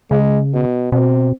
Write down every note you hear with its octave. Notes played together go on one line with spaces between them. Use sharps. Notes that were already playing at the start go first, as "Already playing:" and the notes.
C#3 G#3
B2
B2 C4